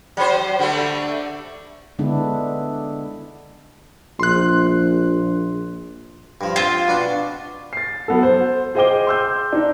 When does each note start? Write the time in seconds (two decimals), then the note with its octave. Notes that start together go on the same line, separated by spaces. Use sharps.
0.17 F#3 C5
0.59 D3 G3 A3
1.99 D3 G#3 B3 D4 E4
4.19 A#1 C6 F#6
6.41 G2 F3
6.56 C4 F4 C5
6.88 B2 D4 F#5
7.73 A6 C7
8.08 F#3 B3 A4
8.23 C5
8.75 G#4 C5 D#5 G5 D6 G7
9.07 C6 E6 G6
9.53 D4 D#4